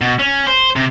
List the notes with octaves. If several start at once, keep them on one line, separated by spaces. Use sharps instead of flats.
B2
C#4
C5
C3